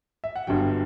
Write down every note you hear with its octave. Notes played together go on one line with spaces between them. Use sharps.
E5
F#5
G1 G2 D3 F#3 G5